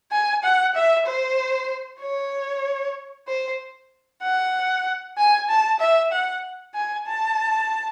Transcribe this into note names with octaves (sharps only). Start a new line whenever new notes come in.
G#5
F#5
E5
C5
C#5
C5
F#5
G#5
A5
E5
F#5
G#5
A5